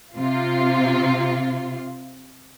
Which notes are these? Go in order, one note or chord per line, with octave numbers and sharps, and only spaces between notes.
C3 F4